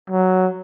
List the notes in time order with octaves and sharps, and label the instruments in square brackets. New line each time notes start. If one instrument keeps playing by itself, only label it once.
[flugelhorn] F#3